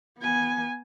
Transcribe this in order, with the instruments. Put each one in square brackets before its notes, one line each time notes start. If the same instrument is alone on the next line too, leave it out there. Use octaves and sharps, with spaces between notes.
[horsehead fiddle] B3 G#5